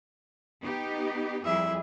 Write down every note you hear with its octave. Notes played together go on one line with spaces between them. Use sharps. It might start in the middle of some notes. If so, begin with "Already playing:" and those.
B3 D#4 G4
F2 G3 E4 G#4 E5